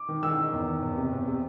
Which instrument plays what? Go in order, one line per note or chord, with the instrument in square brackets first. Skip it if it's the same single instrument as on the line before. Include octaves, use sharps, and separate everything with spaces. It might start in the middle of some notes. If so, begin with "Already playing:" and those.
Already playing: [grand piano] D6
[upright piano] D#3
[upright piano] D#3 [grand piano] E6
[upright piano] D#3
E2
D#3
E2
C3
E2
C3